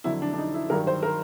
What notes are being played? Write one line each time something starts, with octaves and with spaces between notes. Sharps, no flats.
F2 D3 F#3 E4
D4
D4
D#4
E4
G2 D#3 F#3 A#4
C5
A#4